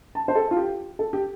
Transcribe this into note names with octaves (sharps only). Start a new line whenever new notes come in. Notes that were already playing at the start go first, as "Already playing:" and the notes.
A5
C5
A4
F4
G4
A4
G4